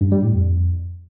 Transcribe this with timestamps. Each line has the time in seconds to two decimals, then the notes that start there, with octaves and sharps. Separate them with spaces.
0.01 G2
0.12 G3
0.23 A2
0.34 F2